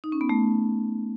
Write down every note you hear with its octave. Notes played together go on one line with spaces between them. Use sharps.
D#4
C#4
B3
A3